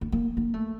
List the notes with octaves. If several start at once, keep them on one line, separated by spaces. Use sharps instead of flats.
A#3
A#3
A#3
A3